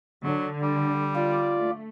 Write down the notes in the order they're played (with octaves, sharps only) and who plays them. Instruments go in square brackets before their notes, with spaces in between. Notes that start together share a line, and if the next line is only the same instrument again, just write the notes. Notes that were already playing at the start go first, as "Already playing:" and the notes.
[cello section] D3 [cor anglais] F#3
[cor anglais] G3
[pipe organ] F4 D5
[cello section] A3